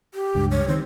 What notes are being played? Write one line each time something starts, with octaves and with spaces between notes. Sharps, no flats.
G4
C#2 G2
C#5
D#3 C4